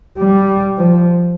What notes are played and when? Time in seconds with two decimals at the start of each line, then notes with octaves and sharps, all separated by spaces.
0.19 G3
0.79 F3